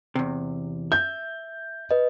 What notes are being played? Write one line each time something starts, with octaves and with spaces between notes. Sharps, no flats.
E2 C3
E5 G6
B4 D#5